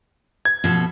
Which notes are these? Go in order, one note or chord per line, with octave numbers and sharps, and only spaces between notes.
G#6
B2 F3 A4